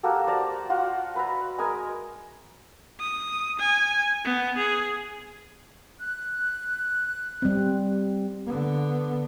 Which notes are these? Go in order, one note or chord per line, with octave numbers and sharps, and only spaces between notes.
A#3 F#4 G4 A4
C5 D5 A5 A#5
F4 F#4 F#5
B4 E5 A#5
G#3 A#4 G#5 D#6
D#6
G#5
B3
G#4
F#6
G3 C4
D3 B3